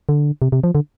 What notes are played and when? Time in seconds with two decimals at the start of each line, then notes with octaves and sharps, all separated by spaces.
0.09 D3
0.42 C3
0.52 C3
0.64 F3
0.75 D3